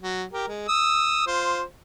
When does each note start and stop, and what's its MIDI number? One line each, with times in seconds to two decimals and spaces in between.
0.02 0.24 54
0.33 0.47 67
0.33 0.47 70
0.48 0.66 56
0.68 1.23 87
0.68 1.23 88
1.27 1.62 65
1.27 1.62 72